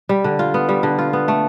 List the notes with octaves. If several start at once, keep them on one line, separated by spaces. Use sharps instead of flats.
G3
D3
F4
B3
G3
D3
F4
B3
A3